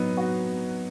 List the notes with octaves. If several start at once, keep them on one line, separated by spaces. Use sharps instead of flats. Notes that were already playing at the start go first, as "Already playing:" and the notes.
Already playing: F#3 B3 D#4
F#4